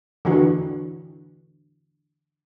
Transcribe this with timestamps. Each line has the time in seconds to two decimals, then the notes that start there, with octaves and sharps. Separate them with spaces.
0.25 D3 E3 F#4